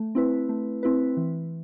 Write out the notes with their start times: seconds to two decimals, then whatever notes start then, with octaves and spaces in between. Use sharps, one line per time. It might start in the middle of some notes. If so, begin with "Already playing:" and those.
Already playing: A3
0.15 C4 E4 B4
0.49 A3
0.83 C4 E4 B4
1.17 E3